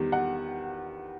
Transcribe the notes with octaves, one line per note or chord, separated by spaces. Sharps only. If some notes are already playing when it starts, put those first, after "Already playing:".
Already playing: E2 D#3 G3
F#5